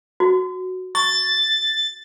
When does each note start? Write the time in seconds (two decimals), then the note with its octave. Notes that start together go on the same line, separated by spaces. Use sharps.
0.20 F#4
0.95 C#6 A6